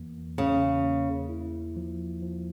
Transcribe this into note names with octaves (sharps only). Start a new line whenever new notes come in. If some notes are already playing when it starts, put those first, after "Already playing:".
Already playing: E2 E3 A#3
E2 C#3
A#3
E4
F3
F3